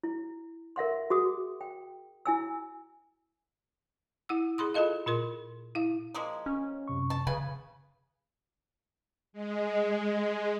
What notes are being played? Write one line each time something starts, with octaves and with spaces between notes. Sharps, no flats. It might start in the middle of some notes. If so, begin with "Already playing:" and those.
E4
A#4 E5 F#5 C6
F#4 G#4 D#6
G5
E4 G#5 E6
E4 F#5 E6
G#4 B5 C6 D#6
F4 G#4 A4 D#5 F5
A#2 F4 A#4 C6
E4 F5
F3 G#3 A#3
C#4
F#2 C3 C#6
A5
C#3 B4 G#5
G#3